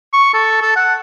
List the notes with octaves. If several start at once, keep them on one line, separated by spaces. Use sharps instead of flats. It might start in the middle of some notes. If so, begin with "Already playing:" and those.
C#6
A4
A4
F#5